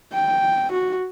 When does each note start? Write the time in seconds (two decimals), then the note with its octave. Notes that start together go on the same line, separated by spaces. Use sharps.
0.13 G5
0.72 F#4